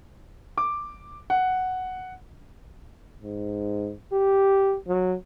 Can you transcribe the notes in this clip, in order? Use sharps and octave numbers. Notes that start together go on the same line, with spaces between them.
D6
F#5
G#2
G4
F#3